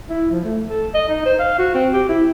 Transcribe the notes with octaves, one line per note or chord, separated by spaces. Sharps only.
E4
F3
A3
A4
D#5
D#4
C5
F5
F#4
C4
G4
E4